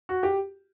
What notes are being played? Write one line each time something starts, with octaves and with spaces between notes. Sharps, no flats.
F#4
G4